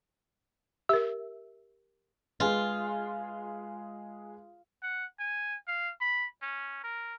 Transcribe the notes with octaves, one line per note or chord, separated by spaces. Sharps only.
G4 A#4 E5
G#3 F4 G#4 B4
F#5
G#5
F5
B5
C#4
A#4